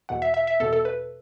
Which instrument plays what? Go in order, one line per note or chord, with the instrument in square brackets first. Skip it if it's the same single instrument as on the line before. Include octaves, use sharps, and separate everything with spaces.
[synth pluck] E2 B2 F#5
E5
E5
E5
E2 B2 A4
A4
B4